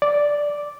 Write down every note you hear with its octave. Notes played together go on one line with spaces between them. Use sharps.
D5